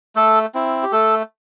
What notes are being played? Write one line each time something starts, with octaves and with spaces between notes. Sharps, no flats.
A3 A4
C4 E4
G4
A3 A4